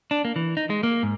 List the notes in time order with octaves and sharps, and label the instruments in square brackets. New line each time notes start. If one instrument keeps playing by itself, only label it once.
[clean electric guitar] D4
A#3
E3
D#4
G#3
A#3
G#2